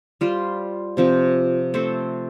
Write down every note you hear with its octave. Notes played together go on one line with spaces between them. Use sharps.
G3 F4 C5
C3 F3 C4
A3 C4 A4 C5